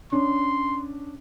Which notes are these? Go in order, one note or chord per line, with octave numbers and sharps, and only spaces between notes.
C#4 D4 C6